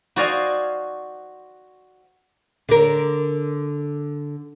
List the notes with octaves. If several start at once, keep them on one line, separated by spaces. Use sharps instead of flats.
F#4 C5 D5 D#5 F5 G#5
D3 A#4